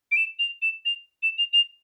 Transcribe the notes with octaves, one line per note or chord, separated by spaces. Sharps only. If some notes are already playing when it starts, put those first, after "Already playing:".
D7
E7
F7
E7
F7
E7
F7
F7